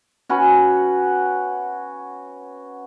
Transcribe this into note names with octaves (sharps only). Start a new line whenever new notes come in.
C#4 F#4 B4